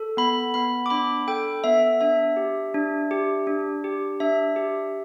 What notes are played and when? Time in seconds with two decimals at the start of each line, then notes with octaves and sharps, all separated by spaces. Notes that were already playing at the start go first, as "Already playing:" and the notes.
Already playing: A4
0.17 B3 B5
0.54 B3 B5
0.86 D6
0.90 D4 B5
1.27 A4 G5
1.64 B3 E5
2.01 D4 E5
2.37 G4
2.74 D4
3.11 G4
3.47 D4
3.84 G4
4.20 D4 E5
4.56 G4